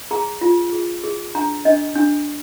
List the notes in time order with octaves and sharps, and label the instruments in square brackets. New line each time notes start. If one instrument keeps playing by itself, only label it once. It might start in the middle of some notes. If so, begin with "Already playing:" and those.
[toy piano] G#4 A#5
F4
G#4
G#4
D4 A#5
D4 D#5
D4